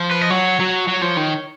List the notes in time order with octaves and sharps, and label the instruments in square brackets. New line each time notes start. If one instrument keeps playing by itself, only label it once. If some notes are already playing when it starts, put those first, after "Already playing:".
Already playing: [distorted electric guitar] F3
[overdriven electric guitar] B4
D#5
[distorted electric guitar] F#3 [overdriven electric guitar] C#5
[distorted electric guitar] F#3
F#3
F3
D#3